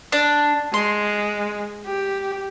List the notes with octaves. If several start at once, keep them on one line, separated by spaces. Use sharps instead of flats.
D4
G#3 C6
G4